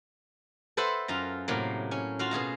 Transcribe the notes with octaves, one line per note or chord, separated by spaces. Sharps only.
A4 B4 C5 E5 F#5
F#2 F4 A#5
A2 C3 F#3 A#3
C#4
F4 F#4 F5
B2 G#4 F5 A#5